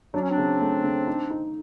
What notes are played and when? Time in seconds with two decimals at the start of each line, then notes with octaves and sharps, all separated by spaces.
0.14 F#3 D4
0.22 C#4
0.30 C4 D4
0.38 C#3
0.61 A3
0.84 C#3
1.07 D#4
1.30 D#4